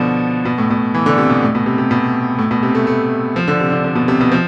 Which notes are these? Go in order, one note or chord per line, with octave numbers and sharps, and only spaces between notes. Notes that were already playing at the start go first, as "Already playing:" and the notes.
Already playing: B2 D3 F3
B2
A2
B2
E3
D3
C3
B2
A2
B2
C3
C3
B2
A2
B2
C3
A3
A3
F3
D3
C3
D3
D3
B2
C3
B2
F3